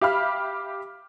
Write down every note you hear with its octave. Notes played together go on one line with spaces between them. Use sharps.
G4 E5 F5 B5 F6